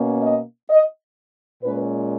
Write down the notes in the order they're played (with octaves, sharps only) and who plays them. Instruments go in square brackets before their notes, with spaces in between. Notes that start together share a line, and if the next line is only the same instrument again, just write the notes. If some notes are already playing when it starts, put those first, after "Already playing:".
Already playing: [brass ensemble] B2 A#3 C#4
D#5
D#5
A#2 G#3 C#4 B4